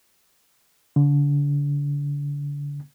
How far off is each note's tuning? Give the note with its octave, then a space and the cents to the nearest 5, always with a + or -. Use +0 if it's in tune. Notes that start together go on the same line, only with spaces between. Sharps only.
D3 -35